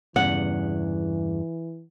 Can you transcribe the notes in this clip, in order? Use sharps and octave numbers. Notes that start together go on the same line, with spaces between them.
E2 G2 C#3 E3 F#5